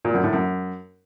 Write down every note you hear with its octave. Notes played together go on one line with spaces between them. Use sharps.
A#2
F#2
A2
F#2